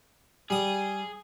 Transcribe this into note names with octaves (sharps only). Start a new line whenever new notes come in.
G3 G#4 D#6